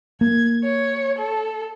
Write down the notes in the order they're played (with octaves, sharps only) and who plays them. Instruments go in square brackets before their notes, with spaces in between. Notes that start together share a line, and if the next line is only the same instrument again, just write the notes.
[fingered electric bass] A#3 [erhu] G#6
[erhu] C#5
A4